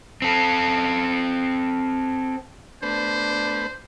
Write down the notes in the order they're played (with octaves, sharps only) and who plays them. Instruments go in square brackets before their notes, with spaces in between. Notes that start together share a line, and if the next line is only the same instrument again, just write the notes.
[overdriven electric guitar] C4 A4
[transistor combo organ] A3 B3 B4 [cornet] D4 [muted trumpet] C5